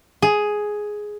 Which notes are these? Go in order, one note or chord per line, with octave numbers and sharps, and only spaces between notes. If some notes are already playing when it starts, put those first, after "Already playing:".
G#4